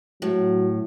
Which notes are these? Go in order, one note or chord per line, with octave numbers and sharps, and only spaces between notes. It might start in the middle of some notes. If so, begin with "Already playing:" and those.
A2 F#3